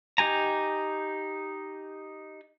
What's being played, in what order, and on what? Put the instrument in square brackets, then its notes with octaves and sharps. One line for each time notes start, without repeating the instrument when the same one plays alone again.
[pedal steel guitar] D#4 G4 G#5 A#5